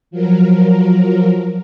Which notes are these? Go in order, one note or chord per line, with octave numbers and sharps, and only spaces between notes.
F3 F#3 A#4